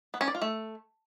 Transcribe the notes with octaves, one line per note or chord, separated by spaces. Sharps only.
B3
C#4
D5
F4
A3